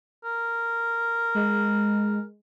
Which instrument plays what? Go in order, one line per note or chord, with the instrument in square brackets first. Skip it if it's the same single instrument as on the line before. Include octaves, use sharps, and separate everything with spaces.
[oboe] A#4
[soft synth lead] G#3